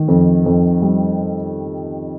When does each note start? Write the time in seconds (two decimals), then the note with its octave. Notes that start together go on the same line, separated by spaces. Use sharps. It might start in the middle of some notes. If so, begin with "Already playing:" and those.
Already playing: D#3
0.08 F2
0.46 F2
0.82 G3